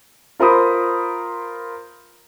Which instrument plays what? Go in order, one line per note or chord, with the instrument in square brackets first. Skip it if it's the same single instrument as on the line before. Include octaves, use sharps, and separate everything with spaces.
[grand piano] F4 A#4 C5 B5 D#6